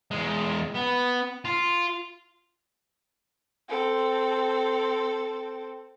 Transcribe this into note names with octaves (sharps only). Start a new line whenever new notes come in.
E2 G#3
B3
F4
C4 A4